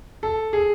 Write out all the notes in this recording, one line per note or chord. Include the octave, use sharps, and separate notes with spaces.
A4
G#4